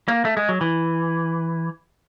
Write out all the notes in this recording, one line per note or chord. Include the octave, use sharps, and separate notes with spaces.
A#3
A3
G#3
F#3
E3